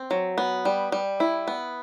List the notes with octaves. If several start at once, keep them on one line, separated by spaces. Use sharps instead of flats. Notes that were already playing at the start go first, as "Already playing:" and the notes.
Already playing: C4
F#3
B3
G3
G3
E4
B3